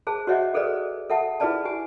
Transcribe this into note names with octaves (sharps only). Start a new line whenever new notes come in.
G#4 C5 A5
F#4 C5 C#5 D#5 E5 F#5
G#4 A4 B4 C5 D5
A4 E5 F#5 A5
E4 F4 G#4 B4 D5 A5
G4 G#5